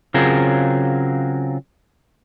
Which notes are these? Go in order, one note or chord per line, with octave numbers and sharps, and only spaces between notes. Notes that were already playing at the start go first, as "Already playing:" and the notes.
C#3 F#3 C4 F4 G#4 A#4